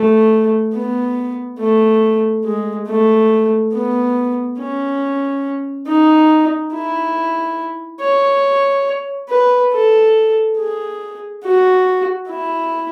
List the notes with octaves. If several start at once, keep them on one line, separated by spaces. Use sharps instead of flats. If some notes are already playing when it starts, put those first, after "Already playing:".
Already playing: A3
B3
A3
G#3
A3
B3
C#4
D#4
E4
C#5
B4
A4
G#4
F#4
E4